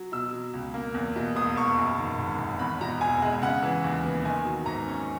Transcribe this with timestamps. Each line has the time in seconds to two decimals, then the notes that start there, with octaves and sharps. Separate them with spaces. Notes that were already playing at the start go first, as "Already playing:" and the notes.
Already playing: F#3
0.12 B2 E6
0.33 F#3
0.54 C#2
0.74 A#3
0.94 E2
1.16 B2
1.36 E1 D#6
1.56 E1 C#6
1.78 F#2
1.99 D#3
2.18 G#1
2.39 G#1
2.59 E2 B5
2.81 B2 A#5
3.01 E1 G#5
3.22 G#3
3.42 C#3 F#5
3.63 E3
3.84 D#2
4.04 B3
4.25 D#3 G#5
4.45 F#3
4.66 G#2 A#5
4.87 C#4